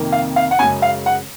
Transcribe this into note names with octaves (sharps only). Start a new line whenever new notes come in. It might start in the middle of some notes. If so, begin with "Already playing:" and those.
Already playing: F2 C3 D#3 A#3
F5
F5
F#5
F#2 C#3 G#3 G#5
F5
F#5